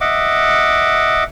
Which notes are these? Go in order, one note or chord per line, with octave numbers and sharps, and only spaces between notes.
D#5 E5 F#5 D6